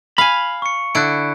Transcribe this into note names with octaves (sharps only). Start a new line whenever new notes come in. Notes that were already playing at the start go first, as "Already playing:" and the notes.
F5 G#5 B5
C#6 C#7
D3 E4 F#6 D7